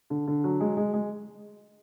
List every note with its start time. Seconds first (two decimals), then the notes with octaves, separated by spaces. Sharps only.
0.10 D3
0.27 D3
0.44 F#3
0.60 G#3
0.77 G#3
0.94 G#3